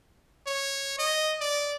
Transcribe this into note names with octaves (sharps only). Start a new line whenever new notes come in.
C#5
D#5
D5